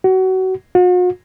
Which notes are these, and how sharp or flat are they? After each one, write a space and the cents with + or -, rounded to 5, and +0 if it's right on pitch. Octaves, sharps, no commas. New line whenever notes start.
F#4 +25
F#4 -45